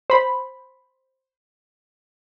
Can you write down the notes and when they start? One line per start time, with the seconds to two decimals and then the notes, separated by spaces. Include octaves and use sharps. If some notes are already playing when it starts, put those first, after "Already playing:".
0.10 C5 B5